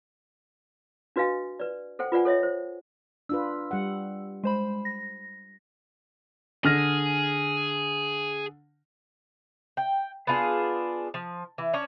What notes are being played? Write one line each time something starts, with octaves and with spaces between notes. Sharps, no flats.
D4 F#4 B4 D#5 F5 G#5
B4 D5
A4 C5 F#5 G5
F4 B4 D5 F#5 G#5
A4 C#5 D#5 E5
C5
D4 F4 B4 E6
G3 F#5
G#3 C5 B5
A#6
D3 G#4 F6 A#6
G5
B3 D4 F4 G#4
F3
E3
C#4 D4 C#5